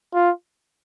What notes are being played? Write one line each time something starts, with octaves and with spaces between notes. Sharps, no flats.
F4